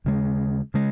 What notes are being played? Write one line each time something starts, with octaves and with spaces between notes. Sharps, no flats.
D#2 C#3 G#3
C#3 G#3